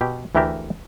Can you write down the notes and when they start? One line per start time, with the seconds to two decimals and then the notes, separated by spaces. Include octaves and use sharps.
0.01 B2 G4
0.35 D2 E3 A3 G4 A#4 E5